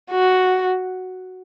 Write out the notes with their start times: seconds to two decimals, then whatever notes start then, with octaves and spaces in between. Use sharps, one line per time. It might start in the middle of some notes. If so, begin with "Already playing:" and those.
0.11 F#4